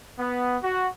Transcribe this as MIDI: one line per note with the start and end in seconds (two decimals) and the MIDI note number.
0.19 0.58 59
0.63 0.88 66